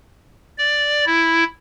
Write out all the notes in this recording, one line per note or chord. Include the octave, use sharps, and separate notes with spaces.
D5
E4